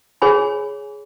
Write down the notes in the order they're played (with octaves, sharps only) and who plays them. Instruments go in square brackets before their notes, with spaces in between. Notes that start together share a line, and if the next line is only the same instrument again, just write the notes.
[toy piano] G#4 C#5 G#5 B5